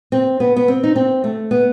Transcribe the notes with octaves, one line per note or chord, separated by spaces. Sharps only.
C4
B3
B3
C4
D#4
C4
A3
B3